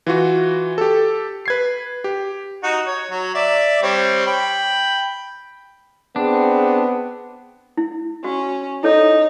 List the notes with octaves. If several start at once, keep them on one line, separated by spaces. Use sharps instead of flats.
E3 F4 F#4
G4 A4
B4 G#6 C7
G4
D#4 F#4
C#5
F#3
D5 E5
G3 C4 C#5
G5 B5
B3 C4 D4 G#4
E4
C#4 F#4
D#4 E4 A4 C#5